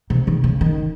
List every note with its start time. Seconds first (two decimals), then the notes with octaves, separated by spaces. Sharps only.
0.10 C3
0.27 D#3
0.44 C#3
0.61 D#3